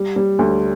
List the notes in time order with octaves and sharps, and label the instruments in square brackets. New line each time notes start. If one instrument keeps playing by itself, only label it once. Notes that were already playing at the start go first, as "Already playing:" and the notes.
Already playing: [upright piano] G3
G3
D2